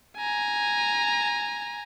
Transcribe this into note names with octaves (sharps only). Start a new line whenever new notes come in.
G#5 A#5